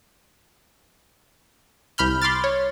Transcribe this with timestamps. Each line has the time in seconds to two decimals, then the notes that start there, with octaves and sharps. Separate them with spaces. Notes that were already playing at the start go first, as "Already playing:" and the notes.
1.98 C2 B5 F6 G6
2.22 B5 C6 D6 F6 A6
2.44 C#5